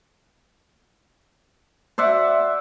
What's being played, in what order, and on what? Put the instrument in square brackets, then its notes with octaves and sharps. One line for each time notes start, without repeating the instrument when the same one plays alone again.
[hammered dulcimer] C5 D5 E5 F#5